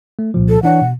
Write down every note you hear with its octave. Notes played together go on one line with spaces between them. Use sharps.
A3
C2 A#2 F3
A4
E3 D4 C#5 F#5
B2